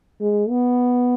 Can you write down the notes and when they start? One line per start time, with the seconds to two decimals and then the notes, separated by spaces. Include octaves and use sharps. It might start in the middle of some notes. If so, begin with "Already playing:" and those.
0.21 G#3
0.50 B3